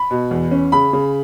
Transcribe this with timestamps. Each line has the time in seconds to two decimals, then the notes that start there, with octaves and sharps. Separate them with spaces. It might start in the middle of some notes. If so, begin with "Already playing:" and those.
Already playing: B5
0.11 B2
0.31 E2
0.51 C#4
0.72 C#3 B5
0.93 C#3